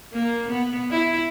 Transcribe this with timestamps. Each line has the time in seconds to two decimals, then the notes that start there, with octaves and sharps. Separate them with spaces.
0.13 A#3
0.49 B3
0.91 E4